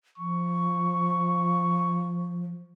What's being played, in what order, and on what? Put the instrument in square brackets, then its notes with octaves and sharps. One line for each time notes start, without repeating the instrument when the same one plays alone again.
[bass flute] F3 [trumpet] C#6